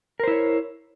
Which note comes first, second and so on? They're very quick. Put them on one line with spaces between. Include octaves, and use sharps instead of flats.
A#4 C5 E4 C#5